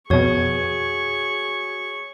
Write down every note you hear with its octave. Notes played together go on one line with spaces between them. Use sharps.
F2 B2 F#4 G#4 C#5 C#6